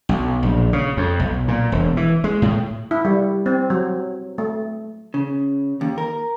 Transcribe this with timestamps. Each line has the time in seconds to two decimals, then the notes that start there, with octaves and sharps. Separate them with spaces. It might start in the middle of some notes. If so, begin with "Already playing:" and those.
0.09 B1
0.43 A#1
0.73 C#3
0.97 F2
1.20 B1
1.48 A#2
1.72 E1
1.97 E3
2.24 G#3
2.42 A2
2.91 E4
3.05 G3
3.46 C4
3.70 F#3
4.38 A3
5.14 C#3
5.81 D#2
5.98 A#4